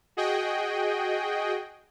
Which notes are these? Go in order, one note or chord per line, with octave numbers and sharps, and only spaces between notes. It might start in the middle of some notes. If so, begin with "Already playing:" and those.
F#4 G#4 D#5 G5